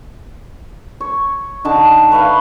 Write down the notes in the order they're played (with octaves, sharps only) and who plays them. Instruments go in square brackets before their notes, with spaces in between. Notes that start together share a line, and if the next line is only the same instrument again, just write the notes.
[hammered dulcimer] C#5
D3 D#4 A5
B4 C#5 E5 F5